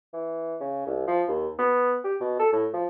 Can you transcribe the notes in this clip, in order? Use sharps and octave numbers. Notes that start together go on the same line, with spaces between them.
E3
C#3
C2
F3
D#2
B3
G4
B2
A4
A2
F3